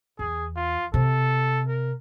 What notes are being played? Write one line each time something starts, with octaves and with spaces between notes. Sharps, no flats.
E2 G#4
F4
C3 A4
A#4